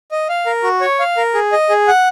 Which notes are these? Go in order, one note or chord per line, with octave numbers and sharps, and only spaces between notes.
D#5
F5
A#4
F#4
C#5
F5
A#4
G#4
D#5
G#4
F#5